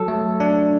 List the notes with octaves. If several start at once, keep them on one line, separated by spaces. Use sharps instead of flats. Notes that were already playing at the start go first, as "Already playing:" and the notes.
Already playing: F#3 A4
A3
D4